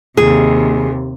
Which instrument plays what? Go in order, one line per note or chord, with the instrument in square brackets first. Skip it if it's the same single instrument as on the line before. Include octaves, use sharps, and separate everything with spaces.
[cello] D#2 C3 [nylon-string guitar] G#4